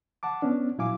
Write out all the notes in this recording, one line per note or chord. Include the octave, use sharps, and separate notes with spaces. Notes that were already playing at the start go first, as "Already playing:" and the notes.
F#5 A5 D6
B3 C#4 D4
A#2 F#3 E4 F5 G#5 D6